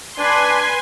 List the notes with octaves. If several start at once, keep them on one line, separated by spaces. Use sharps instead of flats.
D4 B4 G#5 C6